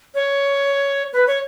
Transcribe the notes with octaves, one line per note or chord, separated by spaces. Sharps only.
C#5
B4
C#5